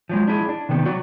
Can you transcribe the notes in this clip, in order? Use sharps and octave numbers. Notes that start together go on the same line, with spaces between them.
F3 F#3 G#3
D4 E4 G#4
D4
C3 D#3 A3 B3 C4
F#3 F#4 D5